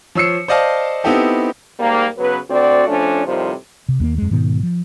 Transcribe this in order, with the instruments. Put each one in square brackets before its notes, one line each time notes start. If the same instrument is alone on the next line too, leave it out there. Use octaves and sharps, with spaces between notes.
[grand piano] F3 C#5 E6 C7 C#7
C5 D5 D#5 F5 A5
B3 C4 D#4 E4 G4 A4
[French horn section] G#2 G3 A#3
C#3 F#3 B3 B4
D2 C4 F#4 D5
F3 A3 C#4 D4
A2 C3 D#3 F3 G3
[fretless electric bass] C3
D#2 A3 A#3
F2 G#3
G#2 B2 D#3 B3
F3